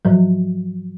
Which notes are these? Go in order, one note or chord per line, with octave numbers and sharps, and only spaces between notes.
G#2 F3 F#3